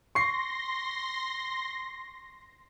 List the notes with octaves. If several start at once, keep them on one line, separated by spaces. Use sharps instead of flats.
C6 C#6 A#6 C7